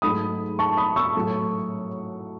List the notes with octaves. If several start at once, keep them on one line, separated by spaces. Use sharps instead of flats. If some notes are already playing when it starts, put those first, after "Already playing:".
G#2 F#3 A3 B5 D#6
A5 C#6
B5 D#6
C#6 E6
A2 F#3 A3